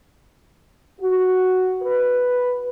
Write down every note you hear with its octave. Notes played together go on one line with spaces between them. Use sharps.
F#4
B4